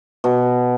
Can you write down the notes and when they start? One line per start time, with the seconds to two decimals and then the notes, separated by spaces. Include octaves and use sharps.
0.24 B2